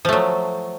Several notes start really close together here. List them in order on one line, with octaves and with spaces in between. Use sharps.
F3 A3 F#3